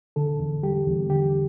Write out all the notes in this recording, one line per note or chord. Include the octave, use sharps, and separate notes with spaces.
D3 A4
E2
G3 G4
E2
D3 G4